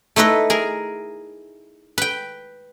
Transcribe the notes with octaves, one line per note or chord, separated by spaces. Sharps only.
A3 D#4 E4 B4 D#5
G#4 A#4
B4 G5